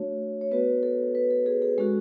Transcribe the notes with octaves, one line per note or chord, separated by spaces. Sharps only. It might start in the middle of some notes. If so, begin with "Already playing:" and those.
Already playing: A3 D4 F#4 C#5
C#5
B3 F#4 B4
A4
B4
A4
G#4
G#4
G#3 C#4 F#4 A4